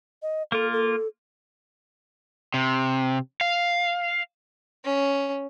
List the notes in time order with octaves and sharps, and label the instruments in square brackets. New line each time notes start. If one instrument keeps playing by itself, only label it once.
[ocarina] D#5
[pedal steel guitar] A#3 F4 [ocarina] A4
[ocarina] A4
[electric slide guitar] C3
F5
[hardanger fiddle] C#4